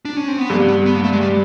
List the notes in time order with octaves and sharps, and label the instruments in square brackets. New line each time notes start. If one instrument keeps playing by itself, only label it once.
[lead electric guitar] D4
C#4
C4
B3
[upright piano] G2 [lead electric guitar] A#3
[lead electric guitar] B3
B3
A#3
A3
G#3
G3